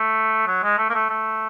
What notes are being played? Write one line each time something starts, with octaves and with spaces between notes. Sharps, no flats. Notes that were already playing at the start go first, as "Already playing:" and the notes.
Already playing: A3
F#3
G#3
A3
A#3
A3
A3